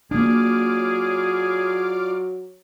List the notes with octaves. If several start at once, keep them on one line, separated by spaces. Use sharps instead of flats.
F#3 A#3 D4 F4 G#4 D5